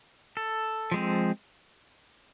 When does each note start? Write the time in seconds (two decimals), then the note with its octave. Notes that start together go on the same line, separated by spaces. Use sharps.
0.37 A4
0.92 F3 G#3 C4